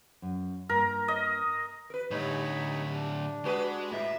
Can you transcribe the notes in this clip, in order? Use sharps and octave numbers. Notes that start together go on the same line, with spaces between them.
F#2
G2 A#3 A#4
D#5
A#4 B4
A2 D3 G3 D#4 C#5 B5
D4
G#3 F#4 G#4 B4
G#2 E5 A#5 B5